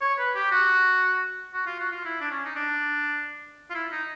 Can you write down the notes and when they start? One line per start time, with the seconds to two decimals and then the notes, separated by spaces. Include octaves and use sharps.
0.01 C#5
0.18 B4
0.35 G4
0.52 F#4
1.54 F#4
1.66 F4
1.79 F#4
1.92 F4
2.05 E4
2.20 D4
2.31 C#4
2.45 D#4
2.56 D4
3.70 F4
3.75 E4
3.91 D#4